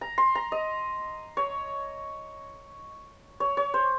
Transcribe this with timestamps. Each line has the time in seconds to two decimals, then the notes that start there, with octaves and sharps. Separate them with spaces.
0.01 A#5
0.18 C6
0.35 A#5
0.52 D#5
1.37 C#5
3.40 C#5
3.57 C#5
3.74 C5